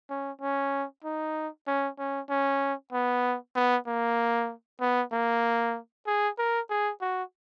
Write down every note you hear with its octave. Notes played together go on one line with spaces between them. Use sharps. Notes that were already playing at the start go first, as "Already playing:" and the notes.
C#4
C#4
D#4
C#4
C#4
C#4
B3
B3
A#3
B3
A#3
G#4
A#4
G#4
F#4